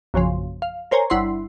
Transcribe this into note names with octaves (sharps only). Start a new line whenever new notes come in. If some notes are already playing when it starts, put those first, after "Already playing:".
A#1 F#2 C#3 F3
F5
A#4 C5 C#5 G#5 A#5
G1 E4 F#5 C6 C7